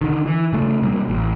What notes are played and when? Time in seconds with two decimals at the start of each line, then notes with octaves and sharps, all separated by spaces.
0.01 D3 D#3
0.25 E3
0.53 C#3 A3
0.82 C3 G3 A#3
1.08 A1